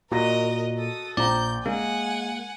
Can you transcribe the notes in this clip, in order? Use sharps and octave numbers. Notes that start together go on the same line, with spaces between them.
A#2 F#4 A#4 D#5 A#6
A4 D#6
A#1 D5 A#5 G6
G#3 A#3 F#5 G#5